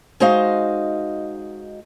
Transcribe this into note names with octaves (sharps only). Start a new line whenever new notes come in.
G#3 D#4 F#4 C5 D#5 F5